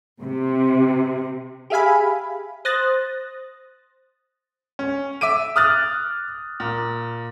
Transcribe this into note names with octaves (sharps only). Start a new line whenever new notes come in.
C3
G4 G#4 E5 F5 G#5 B5
C5 D#6 F#6 A6 A#6
C#4
E5 D6 D7 D#7
D#6 F6 F#6 A6
A#2